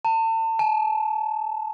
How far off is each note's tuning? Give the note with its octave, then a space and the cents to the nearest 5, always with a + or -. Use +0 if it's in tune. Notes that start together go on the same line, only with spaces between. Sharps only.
A5 +35
A5 -40